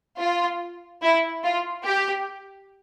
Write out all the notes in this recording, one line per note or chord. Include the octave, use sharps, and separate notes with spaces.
F4
E4
F4
G4